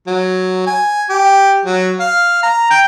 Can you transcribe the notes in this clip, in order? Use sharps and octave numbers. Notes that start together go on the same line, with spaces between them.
F#3
G#5
G4
F#3
F5
A#5
G5